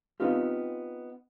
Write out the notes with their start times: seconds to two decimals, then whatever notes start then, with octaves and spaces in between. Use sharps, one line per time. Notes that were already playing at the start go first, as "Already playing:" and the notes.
0.20 B3 C4 D#4 F4 G4